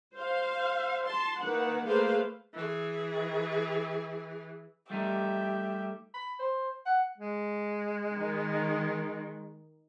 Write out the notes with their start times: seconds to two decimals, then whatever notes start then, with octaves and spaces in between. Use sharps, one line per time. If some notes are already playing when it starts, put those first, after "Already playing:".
0.15 C5 F5
1.06 A5 C6
1.41 D#3 A#3 B4 F#5
1.85 A3 A#3 G#4 B4 C5 F5
2.54 E3 G#4
4.90 G3 A3 D#4 G4 E5
6.14 B5
6.39 C5
6.86 F#5
7.18 G#3
8.11 D#3